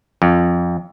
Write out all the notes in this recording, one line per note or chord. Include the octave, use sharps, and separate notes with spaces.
F2